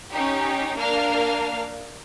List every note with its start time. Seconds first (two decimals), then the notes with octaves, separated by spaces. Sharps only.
0.13 C#4 D#4 G4
0.77 A#3 D4 A#4 F5 F6